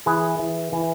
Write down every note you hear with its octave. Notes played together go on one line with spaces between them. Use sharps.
E3 G#4 B4
E3
E3